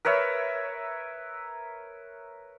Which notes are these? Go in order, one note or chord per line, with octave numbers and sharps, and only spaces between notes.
A#4 B4 C#5 E5